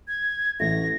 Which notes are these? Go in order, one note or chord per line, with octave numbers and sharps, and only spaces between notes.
G#6
A1 A3 A#6